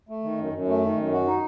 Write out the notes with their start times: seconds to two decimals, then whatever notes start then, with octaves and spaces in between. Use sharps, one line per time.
0.09 A3
0.23 D#3
0.38 F#2
0.53 F#2
0.68 A3
0.83 D#3
0.97 F#2
1.12 F#4
1.27 D#4